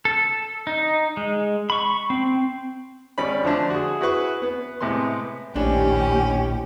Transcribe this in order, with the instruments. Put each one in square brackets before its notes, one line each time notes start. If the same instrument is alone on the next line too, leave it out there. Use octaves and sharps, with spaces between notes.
[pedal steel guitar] A4
D#4
G#3
B5 C#6
C4
[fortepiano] G#1 C#4 D5 B5
D3 F3 A3 D4
F#4 G#4
E4 F#4 G#4 B4 C#6
B3 B4
A2 C3 G#3 B3 C6
[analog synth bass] A#1 [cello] D#2 G4 [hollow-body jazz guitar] A2 D4 D5 [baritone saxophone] C#4